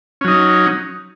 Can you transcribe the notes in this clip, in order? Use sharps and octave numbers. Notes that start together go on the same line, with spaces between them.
F#3 C#4 D#4